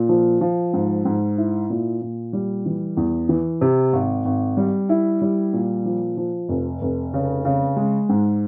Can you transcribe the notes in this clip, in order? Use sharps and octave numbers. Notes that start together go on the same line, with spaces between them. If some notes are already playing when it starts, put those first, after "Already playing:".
Already playing: A#2
F3
F3
G#2
G#2
E4
A#2
A#2
G3
E3
E2
E3
C3
G#1
G#1
G3
E4
G3
A#2
F3
F3
F1
F1
C#3
C#3
G#3
G#2